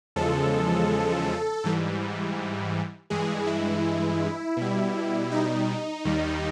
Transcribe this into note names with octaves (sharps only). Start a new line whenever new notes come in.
E2 C#3 F3 G#3 A4
G#2 E3 G3
G2 E3 G#3 G#4
E4
B2 G3
D#4
D#2 D#3 G3